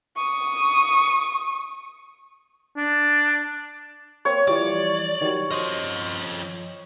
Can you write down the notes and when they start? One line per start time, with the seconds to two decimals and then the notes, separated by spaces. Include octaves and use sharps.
0.16 C#6 D#6
2.77 D4
4.25 A#3 C4 C#5
4.48 E3 F3 G3 D5
5.21 D#3 F#3 G3
5.51 F3 C5 D#5